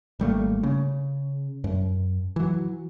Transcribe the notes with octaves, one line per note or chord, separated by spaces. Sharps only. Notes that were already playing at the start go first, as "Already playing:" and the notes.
G#1 G3 A3 A#3
C#3
F#2
E3 F#3